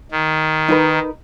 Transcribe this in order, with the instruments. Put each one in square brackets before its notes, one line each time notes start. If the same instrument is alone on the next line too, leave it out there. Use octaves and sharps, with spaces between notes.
[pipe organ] D#3
[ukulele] D#4 A#4 B4